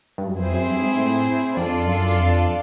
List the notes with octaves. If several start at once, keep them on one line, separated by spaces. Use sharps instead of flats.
G2
F#2
F2 C4 E4 G#4 C5
F#2
G2
G#2
A2
F2 D4 F4 A4 D5
F#2
F2